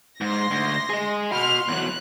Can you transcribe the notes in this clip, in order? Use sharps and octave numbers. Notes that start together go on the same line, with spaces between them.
G#2 C6 A#6
D2
G#4 D#5
F#4 B5 C6 F6
E2 F#3 F#6